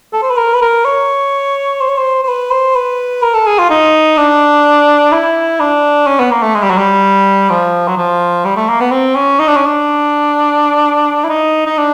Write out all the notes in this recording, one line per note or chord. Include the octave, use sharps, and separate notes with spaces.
A4
C5
B4
A#4
B4
A#4
C#5
C5
C#5
C5
C5
B4
C5
B4
A#4
A4
G#4
F4
D#4
D4
E4
D4
C#4
B3
A#3
A3
G#3
G3
F#3
G3
F3
F#3
F3
G3
A3
A#3
B3
C4
C#4
D#4
D4
C#4
D4
E4
D#4
D#4
D4